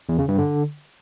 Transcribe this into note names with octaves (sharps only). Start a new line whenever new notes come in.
E2
C#3
G2
D3